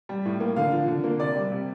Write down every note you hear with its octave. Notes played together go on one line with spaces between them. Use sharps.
G3
A2
A#3
D3 F5
F3
D3
A#3
C3 D5
G3
C3